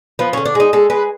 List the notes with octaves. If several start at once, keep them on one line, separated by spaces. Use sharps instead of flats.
F3 B3
C#4
D3
D4
G#3 D#4
G#3 A4
G#3 B4